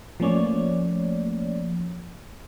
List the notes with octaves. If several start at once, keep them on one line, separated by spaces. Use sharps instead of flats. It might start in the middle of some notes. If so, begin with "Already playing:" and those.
F3 A3 A#3 C#4 C#5 D5